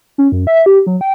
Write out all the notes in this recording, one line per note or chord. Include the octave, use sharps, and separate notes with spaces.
C#4
F#2
E5
G4
F#3
G5